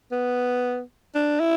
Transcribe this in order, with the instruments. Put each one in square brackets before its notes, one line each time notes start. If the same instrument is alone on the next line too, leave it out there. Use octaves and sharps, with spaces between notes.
[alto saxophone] B3
D4
E4